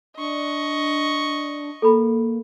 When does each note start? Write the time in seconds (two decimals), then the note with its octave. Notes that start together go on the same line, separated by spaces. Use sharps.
0.17 D4 D#5 C#6
1.82 A#3 A4 A#5 B5